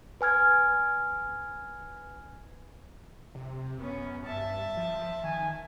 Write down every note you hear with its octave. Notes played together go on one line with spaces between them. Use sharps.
B4 G#5 F6 G#6
C3
F#2 B3 C#4
G2 E5 A5
F3
D#3 G#5